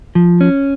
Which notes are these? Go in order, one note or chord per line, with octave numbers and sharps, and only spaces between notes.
F3
C#4